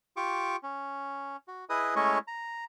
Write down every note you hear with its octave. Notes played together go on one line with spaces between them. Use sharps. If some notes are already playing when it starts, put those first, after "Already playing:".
F4 G4 C#6 D6
C#4
F#4
E4 G#4 B4 D#5 D#6
G#3 A3 C#4 E4 C#5 D#5
A#5